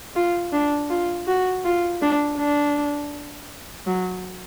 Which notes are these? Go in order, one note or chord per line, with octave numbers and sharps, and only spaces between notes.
F4
D4
F4
F#4
F4
D4
D4
F#3